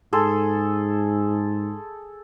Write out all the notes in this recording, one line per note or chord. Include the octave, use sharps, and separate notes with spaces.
G#2 G#4 A4 C6